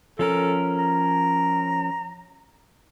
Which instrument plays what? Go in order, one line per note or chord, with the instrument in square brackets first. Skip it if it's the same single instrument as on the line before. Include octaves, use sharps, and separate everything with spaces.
[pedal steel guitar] F3 C#4 A#4 [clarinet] A4
[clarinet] A#5